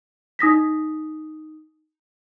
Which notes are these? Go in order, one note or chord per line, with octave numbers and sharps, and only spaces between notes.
D#4 D#6 A#6 B6